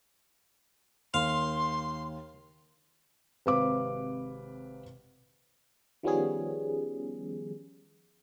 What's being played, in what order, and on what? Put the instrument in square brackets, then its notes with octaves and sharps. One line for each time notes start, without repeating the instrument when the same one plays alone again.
[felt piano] D#2 [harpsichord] F5 [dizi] C6
[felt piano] G#1 C3 B4 F5 D6
[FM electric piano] D#3 F3 G3 B3 C#4 G#4